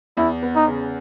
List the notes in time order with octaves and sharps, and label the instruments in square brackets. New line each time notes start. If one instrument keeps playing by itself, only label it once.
[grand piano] E2 [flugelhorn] E4
[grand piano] B3
[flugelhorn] D#4
[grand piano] C#3